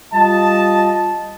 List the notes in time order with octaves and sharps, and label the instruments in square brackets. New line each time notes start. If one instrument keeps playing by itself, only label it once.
[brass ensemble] G3 F4 D#5 A5